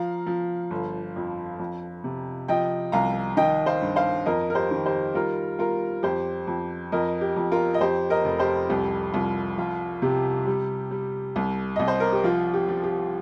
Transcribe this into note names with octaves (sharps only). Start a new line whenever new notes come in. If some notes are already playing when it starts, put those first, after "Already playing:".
Already playing: F3 F5 A#5
F3
G1
F2
F2
C3
F3 D#5 G5
C2 F5 A#5
D#3 D#5 G5
C5 F5
G2
C5 F5
F2 A#4 D#5
A#4
G4 C5
D#3
G4 C5
G3 F4 A#4
G3 F4 A#4
F2 G4 C5
F2
F2 A#4 D#5
G4
F2
F4 A#4
D#5
F2 G4 C5
A#4 D#5
F1
G4 C5
C2 G4
C2 F4
F2 F4
C3 G4
G3
G3
C2
C2 D#5
C5
A#4
G4
F3 F4
G4
F3
G4